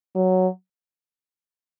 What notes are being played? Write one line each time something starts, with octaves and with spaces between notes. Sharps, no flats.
F#3